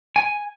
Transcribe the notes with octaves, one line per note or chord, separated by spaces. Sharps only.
G#5